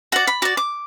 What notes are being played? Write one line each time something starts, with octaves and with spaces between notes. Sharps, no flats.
F#4 D5 F#5
B5
F#4 D5 D6
D6